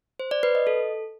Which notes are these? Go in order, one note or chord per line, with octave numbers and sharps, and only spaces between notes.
C5
D5
B4
D#5
A4